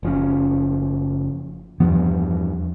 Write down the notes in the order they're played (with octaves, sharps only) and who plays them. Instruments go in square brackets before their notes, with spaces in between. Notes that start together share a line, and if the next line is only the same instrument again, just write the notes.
[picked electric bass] F#1 F3 C#4
[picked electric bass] E2 G2 B3 [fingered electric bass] F3